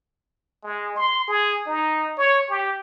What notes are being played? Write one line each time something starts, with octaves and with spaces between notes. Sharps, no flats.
G#3
C6
G#4
D#4
C#5
G4